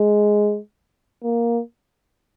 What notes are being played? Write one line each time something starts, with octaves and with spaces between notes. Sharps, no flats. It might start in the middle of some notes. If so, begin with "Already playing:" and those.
Already playing: G#3
A#3